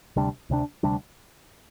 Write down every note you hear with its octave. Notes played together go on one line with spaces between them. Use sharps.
D2 C3 G3 D4
D2 C3 G3 D4
D2 C3 G3 D4